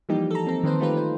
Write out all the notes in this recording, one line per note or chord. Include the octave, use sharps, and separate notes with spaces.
E3 F3 G3 A#3 D#4 G4
A4 A#5
C4 A4
D#3 C4 B4 C5
A3 D#4 F4 G4 B4
C5